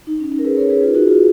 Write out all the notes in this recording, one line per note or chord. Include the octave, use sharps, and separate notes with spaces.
D#4
C#4
D#4
A#4
G#4 B4
A#4 C#5
G#4 B4
F4 G#4
D#4 F#4
F4 G#4